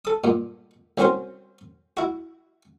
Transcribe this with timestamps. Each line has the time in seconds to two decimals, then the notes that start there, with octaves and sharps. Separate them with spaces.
0.05 A4 D#6
0.24 G2 A#2
0.98 C2 F#3 C4 C#4 A#4 C5
1.97 E4 F#4